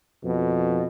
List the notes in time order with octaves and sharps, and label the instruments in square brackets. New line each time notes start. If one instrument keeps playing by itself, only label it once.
[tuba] F2 [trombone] B2